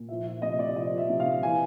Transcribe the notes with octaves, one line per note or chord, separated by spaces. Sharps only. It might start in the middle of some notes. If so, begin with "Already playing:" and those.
Already playing: A#2
F3 E5
F3 E5
C3 D#5
C3 D5
F3 D#5
F3
E5
C3
F5
C3
E3 G#5